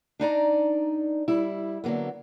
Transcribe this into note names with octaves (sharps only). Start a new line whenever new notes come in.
D4 D#4 D5 A#5
G3 E4
D3 F#3 G#3 A#3 B3